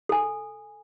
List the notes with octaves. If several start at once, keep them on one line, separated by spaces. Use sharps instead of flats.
A4 G#5